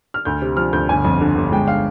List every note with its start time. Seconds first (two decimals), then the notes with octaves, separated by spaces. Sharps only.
0.14 F6
0.25 D2 G6
0.42 C3
0.57 F3 F6
0.73 D2 G6
0.89 G1 G#5
1.05 F2
1.21 D3
1.36 G1
1.52 G#3 G5
1.68 F5